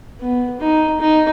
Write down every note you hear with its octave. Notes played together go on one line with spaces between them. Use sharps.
B3
D#4
D#4